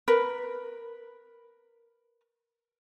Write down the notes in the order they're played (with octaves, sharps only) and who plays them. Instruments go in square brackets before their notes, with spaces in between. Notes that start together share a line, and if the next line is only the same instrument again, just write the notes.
[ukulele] A#4 B4